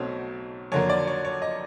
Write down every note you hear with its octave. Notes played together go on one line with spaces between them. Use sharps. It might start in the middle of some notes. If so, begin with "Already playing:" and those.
Already playing: B1 B2 F#3 A3 C4 C#5
F2 D3 F#3 A#3 C#5
D5
C#5
C#5
D#5